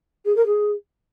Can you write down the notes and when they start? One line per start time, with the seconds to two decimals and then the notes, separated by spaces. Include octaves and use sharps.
0.25 G#4
0.35 A#4
0.46 G#4